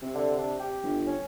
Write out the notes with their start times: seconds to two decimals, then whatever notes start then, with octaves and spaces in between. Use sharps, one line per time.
0.02 C3
0.15 D3
0.38 D4
0.60 G4
0.83 G1
1.07 C#4